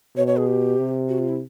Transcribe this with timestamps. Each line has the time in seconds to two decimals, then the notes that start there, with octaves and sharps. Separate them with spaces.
0.16 B2 C#5
0.27 C#5
0.37 G#4
0.47 G4
0.77 C3
1.09 F#4
1.19 F4
1.29 E4